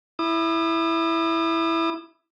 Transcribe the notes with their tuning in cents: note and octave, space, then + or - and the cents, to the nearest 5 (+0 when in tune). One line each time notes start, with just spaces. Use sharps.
E4 +0 D#6 -45